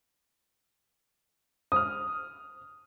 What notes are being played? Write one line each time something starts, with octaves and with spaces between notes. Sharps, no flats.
D#6 F6